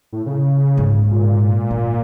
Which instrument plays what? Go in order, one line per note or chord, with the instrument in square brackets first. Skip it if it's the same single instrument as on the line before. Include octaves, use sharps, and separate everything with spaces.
[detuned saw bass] A2
C#3
[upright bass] G#2
[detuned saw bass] A#2
[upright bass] A#3